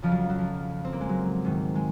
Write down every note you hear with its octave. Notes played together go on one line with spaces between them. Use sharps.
F2 C#3 F3
F#3
F#3
F3
C4
A#3
G#3
F#3
G#2 D#3
G#3